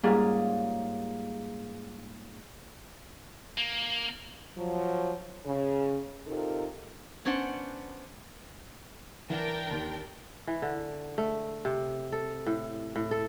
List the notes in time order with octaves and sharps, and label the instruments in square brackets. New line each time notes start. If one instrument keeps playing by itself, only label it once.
[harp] G#2 G3 A#3 C#4 F4 G#4
[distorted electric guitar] A#3
[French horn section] F3 F#3
C#3
C3 D#4 F4 A4 A#4
[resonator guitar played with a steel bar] B3 C#4 D4 C5 F#5
[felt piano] E3 [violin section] D4 A#4 G5
[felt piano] D#2
[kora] E3
D3
A3
C3
A4
A2
A2
A4